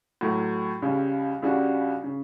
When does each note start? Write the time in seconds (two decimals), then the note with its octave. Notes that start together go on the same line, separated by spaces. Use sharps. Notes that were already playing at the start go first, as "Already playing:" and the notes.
0.21 A2 F#3 A3
0.82 C#2 C#3 G3
1.42 C#2 C#3 G3 D4 F#4
2.04 C#3